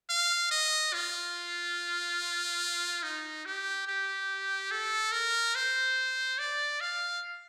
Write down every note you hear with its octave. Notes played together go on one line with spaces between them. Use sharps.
F5
D#5
F4
D#4
G4
G4
A4
A#4
C5
D5
F5